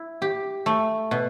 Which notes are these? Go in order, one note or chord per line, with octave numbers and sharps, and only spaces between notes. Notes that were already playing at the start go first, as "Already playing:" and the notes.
Already playing: E4
G4
A3
B2